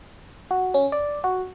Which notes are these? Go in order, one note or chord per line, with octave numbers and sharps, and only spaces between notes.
F#4
C#4
D5
F#4